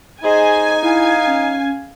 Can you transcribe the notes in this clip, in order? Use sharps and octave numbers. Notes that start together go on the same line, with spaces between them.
D#4 G#4 C5 D#5 G#5
E4 F5
C#4